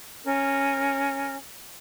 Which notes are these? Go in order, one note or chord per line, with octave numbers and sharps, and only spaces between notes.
C#4 A#4